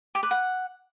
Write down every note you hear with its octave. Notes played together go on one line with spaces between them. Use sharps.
G4
B4
F#5